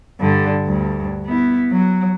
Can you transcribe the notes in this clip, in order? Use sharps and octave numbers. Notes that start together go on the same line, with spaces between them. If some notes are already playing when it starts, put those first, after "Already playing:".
G2 D3
D2 G2
B3 E4
F#3